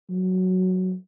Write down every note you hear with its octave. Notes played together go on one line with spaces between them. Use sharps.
F#3